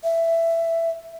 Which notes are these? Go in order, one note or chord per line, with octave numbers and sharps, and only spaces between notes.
E5